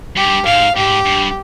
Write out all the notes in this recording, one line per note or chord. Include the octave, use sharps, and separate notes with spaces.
G2 G4
G#2 F5
G#2 G4
G2